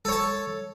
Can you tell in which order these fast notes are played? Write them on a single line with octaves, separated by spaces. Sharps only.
A4 C#5 A5